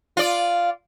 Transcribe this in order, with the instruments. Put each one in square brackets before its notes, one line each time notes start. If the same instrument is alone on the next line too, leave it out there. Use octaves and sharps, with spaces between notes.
[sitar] F4 D5